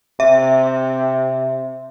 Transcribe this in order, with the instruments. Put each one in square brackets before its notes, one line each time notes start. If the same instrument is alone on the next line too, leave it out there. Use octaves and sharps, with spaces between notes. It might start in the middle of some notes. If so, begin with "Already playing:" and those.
[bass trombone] C3 [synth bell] E5